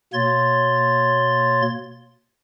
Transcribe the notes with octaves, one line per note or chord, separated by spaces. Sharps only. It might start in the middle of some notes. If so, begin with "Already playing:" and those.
B2 A#3 C#5 C6 A6